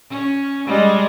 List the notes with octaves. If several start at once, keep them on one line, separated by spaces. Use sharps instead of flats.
C#4
G3 G#3